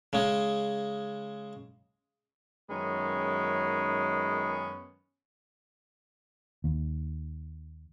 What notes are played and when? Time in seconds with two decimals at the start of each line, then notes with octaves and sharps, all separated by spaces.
0.13 C#3 G#3
2.69 F#2 D#3 G#3 B3 C#4
6.64 D#2